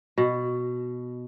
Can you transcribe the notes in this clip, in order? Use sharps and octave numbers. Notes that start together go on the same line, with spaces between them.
B2